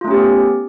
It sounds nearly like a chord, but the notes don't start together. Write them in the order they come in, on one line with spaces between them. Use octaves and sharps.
F4 A3 C#4 G4 B3